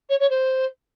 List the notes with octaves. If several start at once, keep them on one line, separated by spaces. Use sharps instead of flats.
C#5
C#5
C5